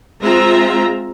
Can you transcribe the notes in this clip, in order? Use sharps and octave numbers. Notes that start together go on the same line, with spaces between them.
G#3 C4 F4 E5 A#5